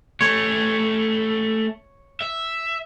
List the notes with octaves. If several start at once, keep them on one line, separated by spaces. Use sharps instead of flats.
A3 C#4 C#5
E5